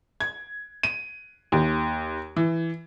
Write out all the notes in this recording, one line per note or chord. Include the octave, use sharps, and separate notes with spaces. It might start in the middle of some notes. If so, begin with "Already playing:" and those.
G#6
D#7
D#2
E3